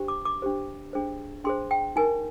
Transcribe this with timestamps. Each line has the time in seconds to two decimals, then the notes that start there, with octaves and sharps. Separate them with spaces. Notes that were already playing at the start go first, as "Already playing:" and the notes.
Already playing: D4 G4 C5
0.08 D6
0.25 D6
0.42 D4 G4 C5
0.93 D4 G#4 C5
1.44 D4 G#4 C5 C6
1.71 G5
1.96 D#4 A#4 G#5